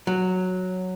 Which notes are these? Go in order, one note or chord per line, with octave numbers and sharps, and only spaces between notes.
F#3